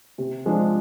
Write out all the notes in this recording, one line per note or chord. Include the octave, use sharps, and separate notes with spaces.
C3
F3 G#3 D4